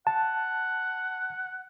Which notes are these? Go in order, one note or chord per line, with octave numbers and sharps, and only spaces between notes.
F#5 A5